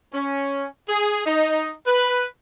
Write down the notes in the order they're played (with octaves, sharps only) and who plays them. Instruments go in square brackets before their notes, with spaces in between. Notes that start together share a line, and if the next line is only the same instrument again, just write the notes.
[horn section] C#4
G#4
D#4
B4